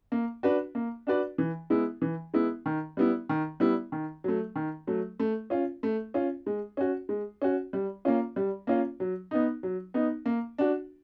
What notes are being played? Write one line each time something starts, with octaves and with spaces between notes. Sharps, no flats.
A#3
D4 F#4 B4 D5
A#3
D4 F#4 B4 D5
E3
G#3 B3 E4
E3
G#3 B3 E4
D#3
G3 B3 E4
D#3
G3 B3 E4
D#3
F#3 A3
D#3
F#3 A3
A3
C#4 F4
A3
C#4 F4
G#3
C#4 F#4
G#3
C#4 F#4
G3
A#3 C#4 F4
G3
A#3 C#4 F4
F#3
B3 D#4
F#3
B3 D#4
A#3
D4 F#4